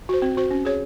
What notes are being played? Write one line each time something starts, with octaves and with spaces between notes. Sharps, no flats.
F#4 C5
C4
F#4 C5
C#4
G#4 C#5